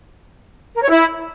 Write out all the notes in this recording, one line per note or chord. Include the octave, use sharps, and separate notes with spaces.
A#4
C#5
E4